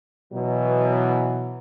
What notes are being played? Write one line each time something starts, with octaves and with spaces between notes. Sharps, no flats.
B2 E3 F#3